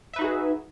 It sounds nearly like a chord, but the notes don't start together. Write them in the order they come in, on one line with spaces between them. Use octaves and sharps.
E5 B4 D#4 F#4 G#4